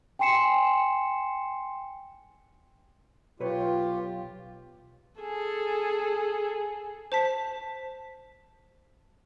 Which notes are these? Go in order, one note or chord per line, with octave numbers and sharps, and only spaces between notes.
G5 G#5 C6 C7 C#7 E7
B1 F4 G4 B4 C#5
G#4 A4
C5 A5 B6